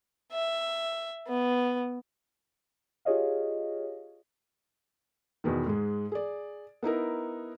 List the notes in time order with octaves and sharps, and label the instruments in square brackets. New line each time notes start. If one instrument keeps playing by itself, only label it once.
[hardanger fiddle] E5
B3
[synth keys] F4 G4 G#4 C#5 D#5 F5
[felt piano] E2 B2 D#3
G#2 G#3
G#4 D5
B3 D#4 E4 A#4